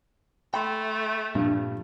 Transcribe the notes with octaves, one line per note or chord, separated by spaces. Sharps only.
A3 G5 B5 C6
G2 A#2 F3